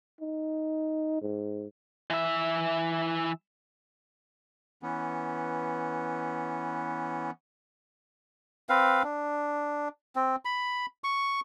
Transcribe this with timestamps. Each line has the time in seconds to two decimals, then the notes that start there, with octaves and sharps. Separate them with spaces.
0.21 D#4
1.22 G#2
2.10 E3 E5
4.83 E3 B3 C#4
8.69 C4 B4 F5
9.03 D4
10.16 C4
10.45 B5
11.04 C#6